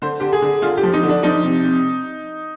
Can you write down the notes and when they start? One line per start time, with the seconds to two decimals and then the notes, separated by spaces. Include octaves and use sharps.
0.02 D3 C5
0.20 D3 G4
0.33 G#4
0.42 D3
0.62 D3 F4
0.77 G4
0.83 F3
0.93 D#4
1.03 D3
1.09 D4
1.23 F3 D#4
1.44 C3
1.64 C3